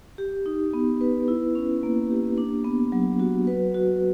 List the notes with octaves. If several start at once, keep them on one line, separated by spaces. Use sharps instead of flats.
G4
D#4
B3
B4
E4
C#4
A#3
G4
D4
B3
F#3
F#4
B4
F#4